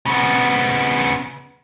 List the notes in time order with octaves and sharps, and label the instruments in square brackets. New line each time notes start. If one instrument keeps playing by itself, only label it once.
[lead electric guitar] C#3 B3